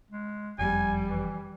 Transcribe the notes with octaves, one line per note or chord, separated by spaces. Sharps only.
G#3
F#1 F2 G3 G#5
E3